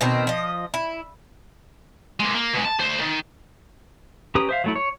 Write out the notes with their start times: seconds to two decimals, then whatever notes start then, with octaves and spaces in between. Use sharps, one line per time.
0.01 B2 D#3 C4 A#4
0.27 F3 D#5
0.74 E4
2.20 G#3 A#3
2.35 A#3
2.54 B2 G#3
2.65 A5
2.80 D2 C5
3.00 D#3
4.35 C#4 G4 B4 A#5 D#6
4.49 C5 E5 F5
4.64 F#3 A3 E4
4.75 C#5